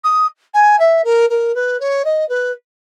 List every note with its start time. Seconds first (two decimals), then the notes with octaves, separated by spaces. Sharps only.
0.04 D#6
0.54 G#5
0.79 E5
1.04 A#4
1.30 A#4
1.55 B4
1.80 C#5
2.05 D#5
2.29 B4